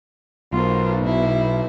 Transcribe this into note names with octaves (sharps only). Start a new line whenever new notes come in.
B1 F4 A#4 C5
B2 E4